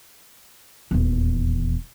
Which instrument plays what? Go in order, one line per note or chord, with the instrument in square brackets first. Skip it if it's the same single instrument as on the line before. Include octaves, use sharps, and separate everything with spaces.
[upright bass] D#1 E2